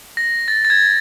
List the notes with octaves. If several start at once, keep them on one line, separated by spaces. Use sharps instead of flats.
A#6
A6
A6
G#6